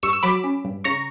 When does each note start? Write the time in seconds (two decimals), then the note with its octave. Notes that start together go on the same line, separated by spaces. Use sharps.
0.03 G2 C#6 E6
0.13 E6
0.23 F#3 B5 D6
0.44 C#4
0.65 G2
0.84 C#3 A#5 C#6